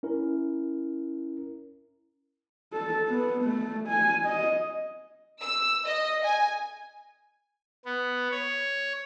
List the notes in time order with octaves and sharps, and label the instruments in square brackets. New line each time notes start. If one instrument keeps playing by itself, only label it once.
[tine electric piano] C#4 E4 A#4
[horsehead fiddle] A4
B3
A3
G#5
D#5
[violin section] E6
D#5
G#5
[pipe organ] B3
C#5